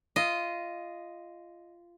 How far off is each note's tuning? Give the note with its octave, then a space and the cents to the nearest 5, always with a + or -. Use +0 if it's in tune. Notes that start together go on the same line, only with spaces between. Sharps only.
F4 -15 D#5 +0